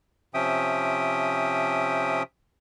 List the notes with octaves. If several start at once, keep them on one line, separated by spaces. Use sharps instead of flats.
C3 F3 C#4 E5 G5 D#6